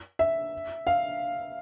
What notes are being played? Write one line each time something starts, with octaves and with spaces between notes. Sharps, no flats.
E5
F5